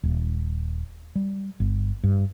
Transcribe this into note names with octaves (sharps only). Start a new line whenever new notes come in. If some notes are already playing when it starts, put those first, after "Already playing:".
D#1
G3
G1
G2